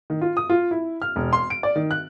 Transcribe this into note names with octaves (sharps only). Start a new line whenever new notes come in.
D#3
F4
D#6
F4
E4
F6
E1
C6
D7
D5
D#3
F#6